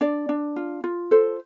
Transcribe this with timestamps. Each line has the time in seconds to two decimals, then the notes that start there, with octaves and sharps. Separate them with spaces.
0.01 D4 D5
0.29 D4
0.56 F4
0.84 F4
1.11 A4 C5